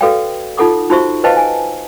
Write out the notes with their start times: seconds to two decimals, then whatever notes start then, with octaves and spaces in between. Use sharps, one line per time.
0.01 F#4 A4 B4 D5 F5 G5
0.57 D#4 F4 A4 F#5 D6 D#6
0.90 D#4 F4 F#4 C5 E5 C#6
1.24 B4 C5 D#5 F5 G5 A5
1.37 G#5